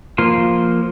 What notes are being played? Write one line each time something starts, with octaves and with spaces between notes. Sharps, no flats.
F3 A#3 F4 C6